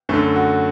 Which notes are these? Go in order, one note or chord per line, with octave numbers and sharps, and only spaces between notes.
F#2 D3 A3
F#4